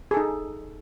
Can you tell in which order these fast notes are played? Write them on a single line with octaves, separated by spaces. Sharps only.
G#4 A4 D#4